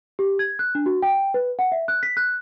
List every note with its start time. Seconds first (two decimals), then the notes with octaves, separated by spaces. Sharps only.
0.19 G4
0.39 G#6
0.59 F#6
0.75 D4
0.86 F#4
1.02 G5
1.34 B4
1.59 F#5
1.72 E5
1.88 F#6
2.03 B6
2.17 F#6